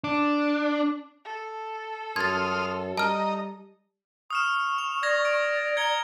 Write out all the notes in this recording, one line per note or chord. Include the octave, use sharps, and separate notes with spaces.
D4
A4
F#2 C6 D#6 F6 G#6 A6
G3 D#5 A5 A#5 F6
C#6 D#6 F6 E7
F7
D5 D#6 G#6 A#6
D7
A#5 G#6 C#7 G7